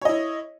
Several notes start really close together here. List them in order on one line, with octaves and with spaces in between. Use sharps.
C#5 D#5 E4